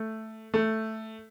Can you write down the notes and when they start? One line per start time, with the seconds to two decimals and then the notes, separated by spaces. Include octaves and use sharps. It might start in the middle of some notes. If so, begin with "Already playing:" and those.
Already playing: A3
0.54 A3